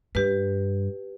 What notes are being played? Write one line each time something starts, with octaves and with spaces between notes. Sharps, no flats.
G2 G4 B4